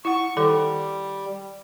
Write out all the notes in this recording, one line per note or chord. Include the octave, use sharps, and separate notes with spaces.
E4 F#5 C#6
D#3 G3 A4 D6